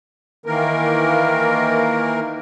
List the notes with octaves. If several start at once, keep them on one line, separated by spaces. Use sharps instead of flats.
D#3 E3 A#3 A#4